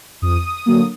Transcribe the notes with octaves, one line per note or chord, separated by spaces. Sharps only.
F2 D#6
D3 F#3 A#3